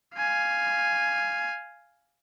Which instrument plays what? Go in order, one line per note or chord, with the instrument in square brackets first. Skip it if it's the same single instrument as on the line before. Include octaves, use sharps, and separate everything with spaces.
[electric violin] F5 G#5